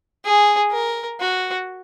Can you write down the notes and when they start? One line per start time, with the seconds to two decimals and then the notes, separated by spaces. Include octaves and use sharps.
0.25 G#4
0.72 A#4
1.20 F#4